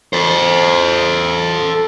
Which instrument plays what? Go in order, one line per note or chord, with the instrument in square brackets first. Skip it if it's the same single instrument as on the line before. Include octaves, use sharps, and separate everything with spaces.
[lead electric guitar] A4 C5